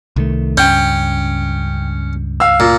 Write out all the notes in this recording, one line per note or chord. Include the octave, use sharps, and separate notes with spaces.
C2 D#3 A3
C#2 G2 C#4 G5 G6
F5 E6
A#2